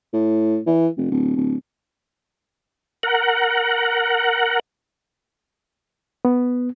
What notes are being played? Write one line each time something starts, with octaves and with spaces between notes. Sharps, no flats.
A2
E3
F1
D1
D1
A#4 F#5
B3